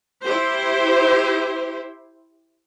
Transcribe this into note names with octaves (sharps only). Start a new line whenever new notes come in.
E4 G4 C5